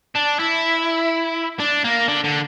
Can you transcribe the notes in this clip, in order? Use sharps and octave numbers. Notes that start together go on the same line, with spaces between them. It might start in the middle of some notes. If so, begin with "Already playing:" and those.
D4
E4
D4
A#3
D3
D3